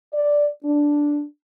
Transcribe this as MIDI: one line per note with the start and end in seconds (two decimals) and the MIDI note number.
0.14 0.48 74
0.64 1.24 62